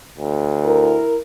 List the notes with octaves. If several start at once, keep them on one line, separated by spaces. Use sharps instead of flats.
D2
E4 A#4